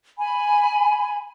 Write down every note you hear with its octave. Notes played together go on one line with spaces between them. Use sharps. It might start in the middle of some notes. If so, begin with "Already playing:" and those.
G#5 B5